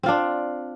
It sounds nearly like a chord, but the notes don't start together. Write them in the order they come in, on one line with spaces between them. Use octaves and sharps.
C4 F4 D4